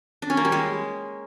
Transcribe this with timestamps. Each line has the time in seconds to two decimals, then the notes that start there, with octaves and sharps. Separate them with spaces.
0.22 D4
0.30 C#4
0.37 A#3
0.45 G3
0.52 G#3